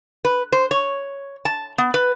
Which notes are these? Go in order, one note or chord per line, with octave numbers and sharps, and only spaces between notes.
B4
C5
C#5
A5
B3
B4